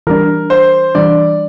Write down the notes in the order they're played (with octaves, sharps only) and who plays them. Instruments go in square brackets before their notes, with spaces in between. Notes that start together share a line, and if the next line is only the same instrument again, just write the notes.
[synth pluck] E3 G3 D4 [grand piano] A#4
[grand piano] C5
[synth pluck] E3 G3 D4 [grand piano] D5